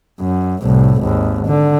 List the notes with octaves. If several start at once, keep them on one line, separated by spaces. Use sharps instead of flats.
F#2
C2 A2
G#1 D#2
D3